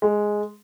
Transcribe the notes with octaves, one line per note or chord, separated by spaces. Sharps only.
G#3